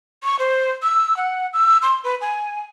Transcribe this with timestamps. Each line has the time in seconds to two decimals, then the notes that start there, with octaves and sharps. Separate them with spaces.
0.23 C#6
0.39 C5
0.83 E6
1.17 F#5
1.53 E6
1.82 C6
2.04 B4
2.21 G#5